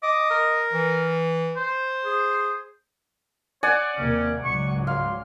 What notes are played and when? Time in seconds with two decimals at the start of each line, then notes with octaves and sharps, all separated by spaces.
0.03 D#5 D6
0.31 A#4
0.73 E3
1.57 C5
2.05 G#4
3.63 C#5 D5 F#5 G#5
3.97 D#2 C3 A#3 C#4
4.45 C#2 G#2 F#3 C#6
4.87 F5 C6